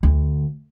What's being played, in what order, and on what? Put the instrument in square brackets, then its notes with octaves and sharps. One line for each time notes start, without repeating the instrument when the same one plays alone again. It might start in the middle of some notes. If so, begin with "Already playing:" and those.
[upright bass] D2